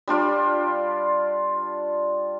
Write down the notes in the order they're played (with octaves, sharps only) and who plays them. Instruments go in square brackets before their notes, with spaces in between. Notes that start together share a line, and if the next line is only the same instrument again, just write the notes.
[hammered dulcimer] G3 D4 F4 D5